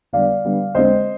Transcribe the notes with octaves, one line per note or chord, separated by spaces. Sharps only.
D3 G3 B3 D5 F5
D3 G3 B3
D3 G#3 C4 C5 D#5